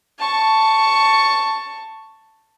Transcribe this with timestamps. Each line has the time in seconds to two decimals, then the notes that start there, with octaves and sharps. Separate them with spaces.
0.19 A5 C#6